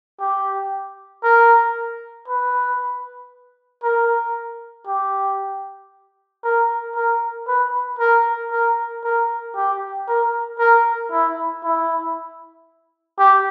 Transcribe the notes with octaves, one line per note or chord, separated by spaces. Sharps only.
G4
A#4
B4
A#4
G4
A#4
A#4
B4
A#4
A#4
A#4
G4
A#4
A#4
E4
E4
G4